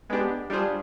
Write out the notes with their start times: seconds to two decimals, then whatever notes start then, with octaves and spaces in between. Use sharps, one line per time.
0.10 G#3 B3 D4 G4
0.50 G3 D4 F4 G#4 C5